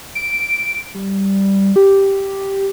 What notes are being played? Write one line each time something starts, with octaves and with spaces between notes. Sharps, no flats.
D7
G3
G4